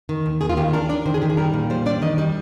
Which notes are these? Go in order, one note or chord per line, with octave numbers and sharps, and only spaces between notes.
D#3
D#2
D#2 G#4
F4
D#3 G4
D4 A#4
D4 D5
D#3 C5
G#4
D#3 G4
G#4
G3 A#4
A#2
G3 C5
D4 D5
D#3 D#5
G3 D#5